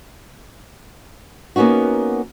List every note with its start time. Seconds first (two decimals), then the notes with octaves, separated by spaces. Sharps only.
1.56 A#3 B3 C#4 D#4 F#4